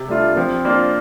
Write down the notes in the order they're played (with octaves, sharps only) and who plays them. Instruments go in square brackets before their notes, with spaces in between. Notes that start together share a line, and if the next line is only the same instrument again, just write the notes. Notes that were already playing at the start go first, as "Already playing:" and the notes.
Already playing: [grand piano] C3
[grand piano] G3 D4 F4 [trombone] A3
[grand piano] F3 [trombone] C4
[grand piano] A#3 D4 F4